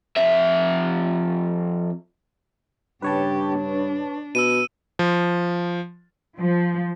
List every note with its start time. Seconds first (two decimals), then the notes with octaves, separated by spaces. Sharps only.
0.17 F2 E5
3.02 G2 C#3 G4 B4 C#5 A5
3.59 D4
4.35 B2 E6 D#7
4.99 F3
6.38 F3